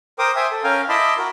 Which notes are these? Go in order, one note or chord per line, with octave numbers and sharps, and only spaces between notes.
A#4 C5 G5 D6 D#6
C5 E5 G5 G#5 D#6
A4
C#4 A#4 F5 G5 G#5
E4 D#5 A5 B5 C6 D6
F#4 A#4